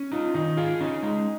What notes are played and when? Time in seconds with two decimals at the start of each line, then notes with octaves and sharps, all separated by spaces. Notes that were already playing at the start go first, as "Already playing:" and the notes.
Already playing: C#4
0.12 D#4 F4
0.34 D#3 D#4
0.57 F4 G#4
0.80 C#4 D#4
1.03 G#3 D#4